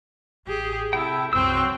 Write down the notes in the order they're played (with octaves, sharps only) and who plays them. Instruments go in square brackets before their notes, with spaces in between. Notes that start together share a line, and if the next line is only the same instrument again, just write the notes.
[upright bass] A1 [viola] G4 G#4
[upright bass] C3 [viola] E4 [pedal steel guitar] A4 G5
[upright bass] C2 F#2 [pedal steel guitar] F#3 E6 [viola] C4 G5